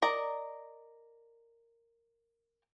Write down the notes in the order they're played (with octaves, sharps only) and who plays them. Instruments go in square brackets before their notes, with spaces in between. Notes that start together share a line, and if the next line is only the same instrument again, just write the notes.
[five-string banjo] A#4 D5 D#5 A#5